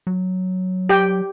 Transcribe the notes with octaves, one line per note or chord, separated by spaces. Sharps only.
F#3
G4 G5